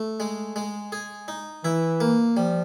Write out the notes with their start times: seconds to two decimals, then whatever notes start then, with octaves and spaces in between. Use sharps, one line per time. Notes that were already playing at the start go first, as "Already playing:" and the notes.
Already playing: A3
0.20 G#3
0.56 G#3
0.92 G#4
1.28 D#4
1.64 E3 E4
2.01 A#3
2.37 F3 G3